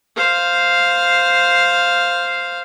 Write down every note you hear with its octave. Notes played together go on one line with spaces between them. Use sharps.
C5 F5